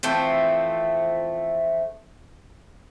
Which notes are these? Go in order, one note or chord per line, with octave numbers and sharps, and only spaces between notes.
E3 F3 A3 C4